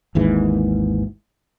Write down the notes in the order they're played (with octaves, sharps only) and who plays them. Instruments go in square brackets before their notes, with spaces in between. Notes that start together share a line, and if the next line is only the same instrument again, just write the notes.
[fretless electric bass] G#1 D#2 G#2 E3